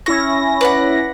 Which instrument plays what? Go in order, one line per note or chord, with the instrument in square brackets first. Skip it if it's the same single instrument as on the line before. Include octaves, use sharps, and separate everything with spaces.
[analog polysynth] C#4 E4 A#6 [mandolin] C#6
[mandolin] B4 D5 F#5